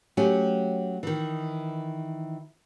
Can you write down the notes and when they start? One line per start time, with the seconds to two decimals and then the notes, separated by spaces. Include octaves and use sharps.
0.17 F#3 A3 C#4 G4
1.03 D#3 E3